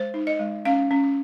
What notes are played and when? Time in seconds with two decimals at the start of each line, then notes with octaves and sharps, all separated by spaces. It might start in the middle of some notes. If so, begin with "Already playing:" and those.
Already playing: G#3 C5
0.14 D#4
0.27 D#5
0.39 G#3
0.65 C#4 F5
0.91 C#4